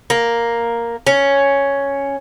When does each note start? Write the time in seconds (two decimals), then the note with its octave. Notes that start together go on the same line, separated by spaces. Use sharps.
0.10 A#3
1.07 C#4